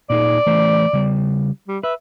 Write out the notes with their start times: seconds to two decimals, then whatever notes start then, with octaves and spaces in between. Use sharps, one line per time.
0.10 A#2 D#4 G#4 D5
0.46 E3 A3 C5
0.93 C#3 G3
1.68 G3
1.83 B4 E5